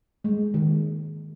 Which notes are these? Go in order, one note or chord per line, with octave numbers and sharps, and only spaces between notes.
G#3
D#3